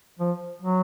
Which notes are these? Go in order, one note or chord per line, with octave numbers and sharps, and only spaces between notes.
F3
F#3